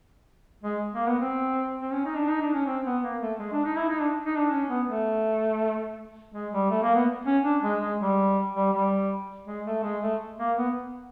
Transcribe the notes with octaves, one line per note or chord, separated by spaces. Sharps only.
G#3
A#3
B3
C4
C4
C#4
D#4
D4
D#4
D4
C#4
C4
B3
A#3
A3
G#3
D4
D#4
E4
D#4
D4
D#4
D4
C#4
B3
A3
G#3
G3
A3
A#3
B3
C#4
D4
G#3
G#3
G3
G3
G3
G#3
A3
G#3
A3
A#3
B3